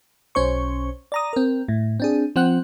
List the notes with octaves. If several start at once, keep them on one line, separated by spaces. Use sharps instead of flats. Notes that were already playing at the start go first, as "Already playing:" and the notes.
B1 C#4 C5 C#6
D5 A#5 D#6
C4 A#4
A2
C4 D4 G#4
F3 C4 F#5 F#6